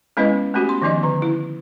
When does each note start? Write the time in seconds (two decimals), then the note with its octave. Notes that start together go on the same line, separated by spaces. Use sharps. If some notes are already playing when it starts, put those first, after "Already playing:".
0.17 G#3 B3 C#4 E4 B4 D#5
0.54 A3 B3 C#4 F#4 G4
0.69 C6
0.82 D#3 F3 B3 D#4 D5 D#5
1.03 D3 A#5
1.22 E4